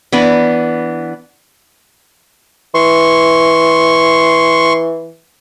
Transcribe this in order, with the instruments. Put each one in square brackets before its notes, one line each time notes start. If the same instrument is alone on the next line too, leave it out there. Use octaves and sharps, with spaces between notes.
[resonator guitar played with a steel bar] E3 B3 D4
[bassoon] E3 [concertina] C6 C#6